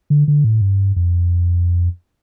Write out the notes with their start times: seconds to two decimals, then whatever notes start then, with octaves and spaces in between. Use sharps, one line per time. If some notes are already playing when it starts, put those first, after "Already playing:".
0.10 D3
0.28 D3
0.44 A2
0.61 G2
0.96 F2